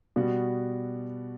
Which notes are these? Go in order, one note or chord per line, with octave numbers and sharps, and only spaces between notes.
B2 G3 B3 F#4